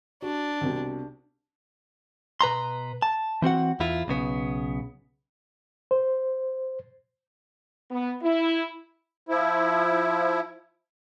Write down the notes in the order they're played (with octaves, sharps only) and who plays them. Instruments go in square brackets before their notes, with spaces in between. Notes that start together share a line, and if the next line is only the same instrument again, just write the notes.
[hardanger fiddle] D4 [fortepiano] F#4
[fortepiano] C2 B2
[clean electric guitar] B2 B4 A#5 C6
A5
E3 C4 F#4 F#5
E2 E4 F4
B1 C#3 B3
[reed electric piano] C5
[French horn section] B3
E4
[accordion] F3 E4